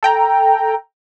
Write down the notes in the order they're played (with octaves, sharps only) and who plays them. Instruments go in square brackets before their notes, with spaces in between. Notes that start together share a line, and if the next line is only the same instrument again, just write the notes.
[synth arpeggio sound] A4 G5 A#5